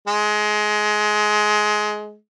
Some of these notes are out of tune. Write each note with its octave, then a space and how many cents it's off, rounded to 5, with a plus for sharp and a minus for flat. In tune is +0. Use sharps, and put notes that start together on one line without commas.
G#3 +20